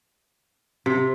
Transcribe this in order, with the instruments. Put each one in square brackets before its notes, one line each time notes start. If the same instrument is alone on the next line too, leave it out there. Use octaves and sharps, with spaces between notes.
[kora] C3